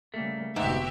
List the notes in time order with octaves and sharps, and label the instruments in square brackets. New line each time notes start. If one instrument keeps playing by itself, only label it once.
[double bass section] C#3 G3 A#3 [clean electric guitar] A3
[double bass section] F1 D3 B3 [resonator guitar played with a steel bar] G#2 [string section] F#4 G4 E5